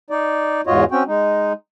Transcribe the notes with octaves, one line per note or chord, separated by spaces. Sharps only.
D#4 D5
E2 G#2 F4 F#4 C#5 D#5
C4 C#4 F#4 G5
G#3 D#4